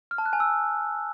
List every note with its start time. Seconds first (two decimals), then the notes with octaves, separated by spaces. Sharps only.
0.11 F6
0.18 A5
0.26 F#6
0.33 G#5
0.40 E6